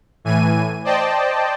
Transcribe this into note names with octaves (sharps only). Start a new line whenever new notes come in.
A2 E3 G#5 D#7
C5 D5 D#5 G5 A5